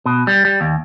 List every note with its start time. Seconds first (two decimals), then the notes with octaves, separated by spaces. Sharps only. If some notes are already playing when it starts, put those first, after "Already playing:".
0.06 B2
0.27 G3
0.45 G3
0.61 D#2